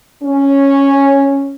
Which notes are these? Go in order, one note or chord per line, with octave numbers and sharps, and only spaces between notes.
C#4